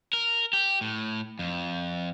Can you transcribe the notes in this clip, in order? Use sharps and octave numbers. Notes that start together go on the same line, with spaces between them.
A#4
G4
A2
F2